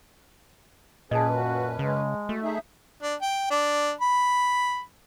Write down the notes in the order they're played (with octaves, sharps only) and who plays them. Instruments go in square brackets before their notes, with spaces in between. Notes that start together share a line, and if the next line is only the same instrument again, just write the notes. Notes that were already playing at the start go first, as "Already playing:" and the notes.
[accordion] F#2 C#4 B4 [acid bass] A#2 [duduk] G#4 [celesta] D#5 A5
[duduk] F#4
[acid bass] C#3 [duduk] G#3
[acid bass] A3 [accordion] F#4
[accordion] D#4 G#4 E5
[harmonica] D4
G5
D4
B5